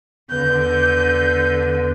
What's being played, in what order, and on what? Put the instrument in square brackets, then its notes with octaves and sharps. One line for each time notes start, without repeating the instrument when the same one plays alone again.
[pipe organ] E2 B4 [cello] D3 [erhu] G6